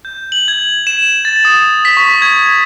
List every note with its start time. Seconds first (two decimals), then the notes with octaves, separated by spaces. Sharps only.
0.05 G6
0.32 F#7
0.48 G#6
0.87 E7
1.25 A6
1.45 D#6
1.85 B6
1.97 C#6
2.22 G#6